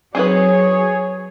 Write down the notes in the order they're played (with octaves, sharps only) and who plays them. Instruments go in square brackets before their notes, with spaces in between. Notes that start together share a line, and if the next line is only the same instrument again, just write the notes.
[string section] F#3 [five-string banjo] C4 D#4 B4 [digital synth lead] G#4 [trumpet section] C#5